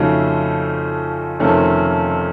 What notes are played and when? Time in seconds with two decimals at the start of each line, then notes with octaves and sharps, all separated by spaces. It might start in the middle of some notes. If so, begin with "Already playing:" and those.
Already playing: F2 C#3 A3 D#4 F#4
1.40 F2 C3 D#3 A3 C#4